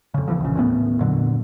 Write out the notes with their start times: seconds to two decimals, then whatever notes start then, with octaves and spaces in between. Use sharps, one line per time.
0.14 F2 C#3
0.28 D#2 E3 F3
0.40 A#1 C#3
0.55 D#2 A2 B3
1.00 F2 A#2 D3 F#3